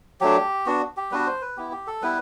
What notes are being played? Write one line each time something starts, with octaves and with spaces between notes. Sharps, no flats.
F#3 A3 D4 G4
B3 D4 F#4
G4
G3 B3 D4 F#4 B4
C5
B4
B3 E4 G4
G4
A4
G3 B3 E4 B4